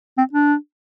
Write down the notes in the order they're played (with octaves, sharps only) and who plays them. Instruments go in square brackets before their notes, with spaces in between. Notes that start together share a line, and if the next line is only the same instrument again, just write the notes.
[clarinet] C4
D4